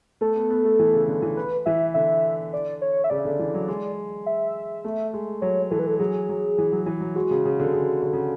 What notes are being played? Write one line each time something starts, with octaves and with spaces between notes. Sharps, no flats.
A3 A4
B3
B3
A3
E3
C#3
D3
E3
B4
E3 E5
D3 E5
D5
C#5
E5
C#3 D5
D3
E3
F#3
G#3
E5
A3
G#3
F#3 C#5
E3 A4
B4
A4
F#3 G#4
F#3
E3
F#3
E3
F#3
G#3 F#4
C#3
C#3
D3
C#3
D3
C#3